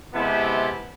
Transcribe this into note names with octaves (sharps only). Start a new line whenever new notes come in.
C3 G#3 B3 E4 G4 A5